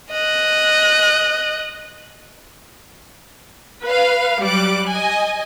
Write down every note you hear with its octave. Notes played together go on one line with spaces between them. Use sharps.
D#5 F#6
B4 F5
F#3 G3 D6 F#6
D#5 G#5